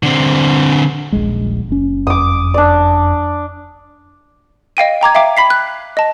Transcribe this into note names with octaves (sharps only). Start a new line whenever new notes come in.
D3 C4
D#1 A#1 G#3
F#1 C#4
F2 D6 D#6
D4 D5
D#5 F5 G5 D#7
G5 A#5 D6 G#6
E5 F5 G5 D6
B5 B6 C7
F#6
D#5 A5